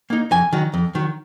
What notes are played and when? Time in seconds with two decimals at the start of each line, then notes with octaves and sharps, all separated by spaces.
0.10 A#3 D#4
0.31 F2 G#5
0.53 D#3 F#3
0.74 F2
0.95 D#3 F#3